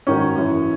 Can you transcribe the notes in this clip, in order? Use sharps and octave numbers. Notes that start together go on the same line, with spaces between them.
G#2 D#3 F#3 C#4
F#2 E3